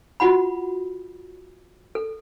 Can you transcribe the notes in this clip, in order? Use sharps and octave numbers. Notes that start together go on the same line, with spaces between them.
F4 F#4 F#5 B5
A4